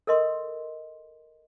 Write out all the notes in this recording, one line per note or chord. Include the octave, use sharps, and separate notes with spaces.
A4 A#4 D#5 C6